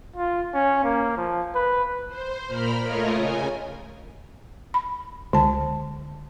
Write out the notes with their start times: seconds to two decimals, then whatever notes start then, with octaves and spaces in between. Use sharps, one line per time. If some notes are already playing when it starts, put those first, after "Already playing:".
0.16 F4
0.54 C#4
0.84 A#3
1.17 F3
1.55 B4
2.08 C5
2.47 A#2 A#4 B5 F6
2.81 A3 F4 A#4 C#5 D#5
3.12 C#3 G#5
4.74 B5
5.33 C#2 D3 A5